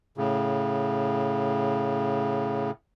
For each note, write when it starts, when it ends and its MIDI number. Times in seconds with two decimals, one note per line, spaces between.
0.17 2.71 45
0.17 2.71 49